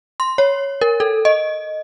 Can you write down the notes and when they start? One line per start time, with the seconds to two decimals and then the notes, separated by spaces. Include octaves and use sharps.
0.20 C6
0.38 C#5
0.81 A#4
1.00 A4
1.25 D#5